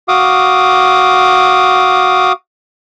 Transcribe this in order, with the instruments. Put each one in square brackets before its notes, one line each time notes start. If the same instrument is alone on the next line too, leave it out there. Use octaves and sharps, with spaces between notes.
[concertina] F#4 F5 D6 D#6